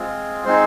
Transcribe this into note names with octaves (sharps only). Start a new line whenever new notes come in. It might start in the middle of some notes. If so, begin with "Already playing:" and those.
Already playing: G#3 C4 F4 G#4
G#3 C4 D#4 G#4 C5